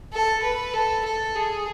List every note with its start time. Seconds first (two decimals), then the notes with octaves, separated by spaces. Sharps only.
0.13 A4
0.43 B4
0.74 A4
1.05 A4
1.35 G#4